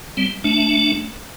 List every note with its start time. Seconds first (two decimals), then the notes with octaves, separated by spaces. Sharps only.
0.17 G3 C4
0.44 A3 D4